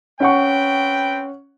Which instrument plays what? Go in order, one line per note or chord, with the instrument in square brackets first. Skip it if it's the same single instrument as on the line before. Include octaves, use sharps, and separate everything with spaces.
[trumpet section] C4 B4 G5 [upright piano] C#4 F#5 C#6